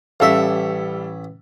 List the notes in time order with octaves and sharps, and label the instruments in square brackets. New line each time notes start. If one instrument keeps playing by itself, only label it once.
[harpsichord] A1 E5 [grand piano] G3 A4 F5